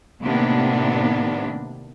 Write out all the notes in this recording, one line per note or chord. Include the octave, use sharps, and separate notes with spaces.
A2 C3 D#3 A#3 B3 D4